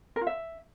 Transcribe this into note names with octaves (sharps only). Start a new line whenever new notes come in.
A#4
F4
E5